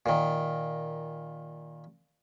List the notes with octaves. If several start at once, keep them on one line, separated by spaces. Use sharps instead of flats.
A#2 D#3